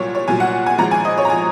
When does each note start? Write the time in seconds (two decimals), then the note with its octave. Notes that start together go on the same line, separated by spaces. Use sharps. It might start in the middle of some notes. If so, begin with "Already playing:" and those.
Already playing: C2 A#2 F#3 C#5
0.15 C#5
0.28 C2 A#2 F#3 G#5
0.40 F#5
0.66 G#5
0.78 G#1 G#2 F3 A#5
0.91 G#5
1.05 D#5
1.18 C#5
1.25 A#5
1.30 F3 G#5